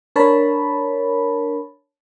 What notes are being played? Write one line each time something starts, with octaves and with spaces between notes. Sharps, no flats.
D4 A#4 C#5 A5 B5